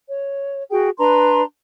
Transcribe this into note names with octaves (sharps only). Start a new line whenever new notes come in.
C#5
F#4 G#4 G5
D4 B4 A#5 C6